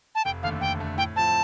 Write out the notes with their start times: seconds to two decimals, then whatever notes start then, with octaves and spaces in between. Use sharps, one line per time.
0.15 A5
0.25 F1 G5
0.43 D#2 D3 A3 F5
0.61 F1 G5
0.79 D#2 D3 A3
0.98 A2 G5
1.16 F3 C4 A5